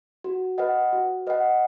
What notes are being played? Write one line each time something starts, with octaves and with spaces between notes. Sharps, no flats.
F#4
B4 D#5 F#5
F#4
B4 D#5 F#5